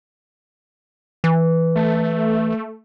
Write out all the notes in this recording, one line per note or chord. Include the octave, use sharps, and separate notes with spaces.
E3
A3